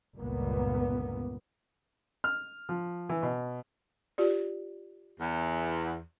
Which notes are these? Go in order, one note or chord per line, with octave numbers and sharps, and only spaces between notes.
G1 C#2 G2 A#2 A#3 B3
F6
F3
E3
B2
F4 G4 D5
E2